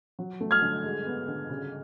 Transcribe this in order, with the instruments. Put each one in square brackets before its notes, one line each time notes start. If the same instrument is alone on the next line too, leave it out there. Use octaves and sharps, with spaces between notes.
[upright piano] F#3
A3
[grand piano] F6 G#6
[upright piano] D3
G#3
B3
D3
C#3